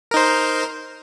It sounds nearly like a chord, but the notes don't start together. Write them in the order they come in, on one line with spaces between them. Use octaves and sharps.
A#4 D#4 C5